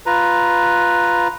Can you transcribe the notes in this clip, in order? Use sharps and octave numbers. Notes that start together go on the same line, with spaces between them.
F4 B4 A#5